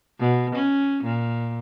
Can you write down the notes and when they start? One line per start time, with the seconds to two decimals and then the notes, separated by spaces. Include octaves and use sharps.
0.19 B2
0.55 C#4
1.04 A#2